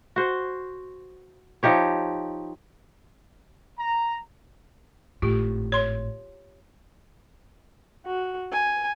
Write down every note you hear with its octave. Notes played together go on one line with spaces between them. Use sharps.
F#4 C5
F3 D#4 G4 C#5
A#5
G#1 A2 F4 G4
C#5 C6
F#4
G#5